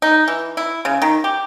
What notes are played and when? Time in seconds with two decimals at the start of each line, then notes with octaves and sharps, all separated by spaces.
0.02 D#4
0.28 E3
0.57 E4
0.85 C#3
1.02 D#3
1.24 G4